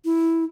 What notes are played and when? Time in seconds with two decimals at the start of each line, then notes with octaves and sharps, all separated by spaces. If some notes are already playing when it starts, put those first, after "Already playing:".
0.05 E4